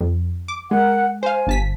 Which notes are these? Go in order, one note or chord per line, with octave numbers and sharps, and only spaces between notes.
F2
D6
G#3 A#4 F#5
C5 F5 G#5
G1 A5 B6